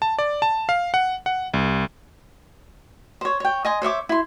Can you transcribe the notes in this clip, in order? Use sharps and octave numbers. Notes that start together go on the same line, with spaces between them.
A5
D5
A5
F5
F#5
F#5
C2
C5 C#5
C#5 G5
D#5 G#5 C6
C5 C#5 E5 D6
E4 C6